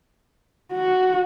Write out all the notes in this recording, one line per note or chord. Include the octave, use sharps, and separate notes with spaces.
F#4